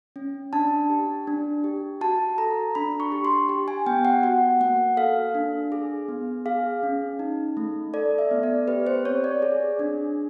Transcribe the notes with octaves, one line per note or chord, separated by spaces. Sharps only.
C#4
D4 A5
G4
D4
G4
F#4 A5
A4 A#5
D4 B5
C#6
G4
C6
G4
G#5
B3 G5
F#5
F#4 F#5
A#3 F#5
A4 F5
D4
G#4
B3
G#4 F5
C#4
D#4
A3
A4 D5
E5
B3
D5
G4 B4
C5
C4 C#5
D5
G#4
D4